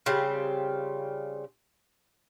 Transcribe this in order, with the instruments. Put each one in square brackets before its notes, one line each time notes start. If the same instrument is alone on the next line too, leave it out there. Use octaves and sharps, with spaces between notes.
[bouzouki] C#3 G3 C4 F4